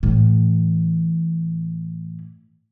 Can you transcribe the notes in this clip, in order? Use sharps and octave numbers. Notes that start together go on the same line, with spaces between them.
A2 E3